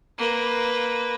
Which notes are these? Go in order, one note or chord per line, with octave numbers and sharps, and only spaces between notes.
A#3 B4